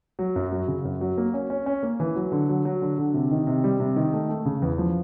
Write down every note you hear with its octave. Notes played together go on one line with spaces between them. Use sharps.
F#3
F#2
F#3
C#3
F#2
F#3
A#3
C#4
C#4
C#4
A#3
E3
F#3
D3
F#3
F#3
D3
D3
C3
D#3
C3
G3
C3
D#3
A3
A3
C#3
E2
F3